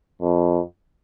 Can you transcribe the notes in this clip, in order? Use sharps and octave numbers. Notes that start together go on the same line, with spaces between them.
F2